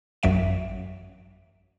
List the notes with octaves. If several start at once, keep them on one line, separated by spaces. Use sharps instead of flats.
A1 F#2 F#3 E5 D7